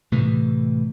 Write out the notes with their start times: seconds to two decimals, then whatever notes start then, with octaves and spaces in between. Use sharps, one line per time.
0.12 A2 C3 E3